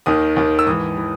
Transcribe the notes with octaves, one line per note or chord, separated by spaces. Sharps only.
D#2 D#3 D#6
D#2 D#3
E6
G#2 E3 D#6
E3